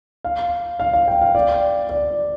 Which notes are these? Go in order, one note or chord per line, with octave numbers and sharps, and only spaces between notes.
F5
F5
F5
G5
F5
D5
D5